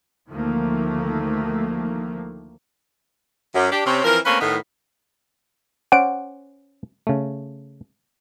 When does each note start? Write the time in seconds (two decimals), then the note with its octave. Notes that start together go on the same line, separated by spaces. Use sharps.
0.30 D2 D#3 F3 A3 A#3
3.55 F#2
3.71 D4 G4
3.86 C3 C4 C#4
4.04 E3 F3 C4 A#4
4.25 A3 A#3 C4 C#4 B4 C#5
4.41 A2 D#3 B3
5.92 C#4 C5 D5 F#5 D7
7.07 C#3 A3